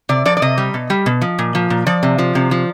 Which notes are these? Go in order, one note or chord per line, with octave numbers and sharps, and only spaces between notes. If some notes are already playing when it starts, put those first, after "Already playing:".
C3 D5
F3 D5
D5
C3 D#5
G3
B2
G3
B2
F3
A#2
F3
A#2
F3 D5
C3
F3
C3
F3